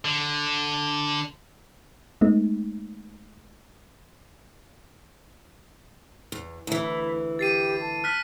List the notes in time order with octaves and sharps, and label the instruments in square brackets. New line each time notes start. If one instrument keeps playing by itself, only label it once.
[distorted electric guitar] D3
[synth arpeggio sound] G#3 A3 B3 D#4
[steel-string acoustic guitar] E2
[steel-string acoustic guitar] D2 E3 [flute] E4
[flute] G4 [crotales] A6 C7 D#7
[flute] A5
[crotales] F6 F#6 B6